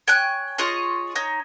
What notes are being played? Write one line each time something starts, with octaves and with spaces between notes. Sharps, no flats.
C#5 G5 G#5 F#6
F4 G#4 C#5 D#5
D#4 C#5